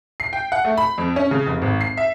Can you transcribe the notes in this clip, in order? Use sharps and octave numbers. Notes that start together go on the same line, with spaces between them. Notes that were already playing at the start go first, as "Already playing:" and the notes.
C7
G5
F#5
A3
B5
F2
C#4
C#3
F1
G#1
C7
E5